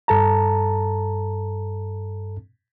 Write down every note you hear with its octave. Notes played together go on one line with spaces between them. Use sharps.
G2 A4 A5 A#5